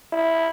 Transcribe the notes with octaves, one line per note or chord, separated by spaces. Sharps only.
E4